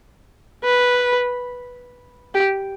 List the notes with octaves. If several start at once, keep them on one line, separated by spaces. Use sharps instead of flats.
B4
G4